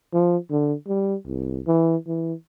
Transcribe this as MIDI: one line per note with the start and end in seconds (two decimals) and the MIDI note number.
0.14 0.37 53
0.51 0.73 50
0.88 1.15 55
1.27 1.60 36
1.67 1.96 52
2.07 2.33 52